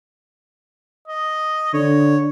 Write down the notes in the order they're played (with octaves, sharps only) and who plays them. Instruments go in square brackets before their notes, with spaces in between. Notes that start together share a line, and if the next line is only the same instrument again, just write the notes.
[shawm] D#5
[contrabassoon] D3 [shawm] C#5